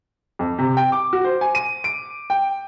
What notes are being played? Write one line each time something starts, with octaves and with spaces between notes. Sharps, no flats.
F2
C3
G5
D6
F#4
C5
G#5
D#7
D7
G5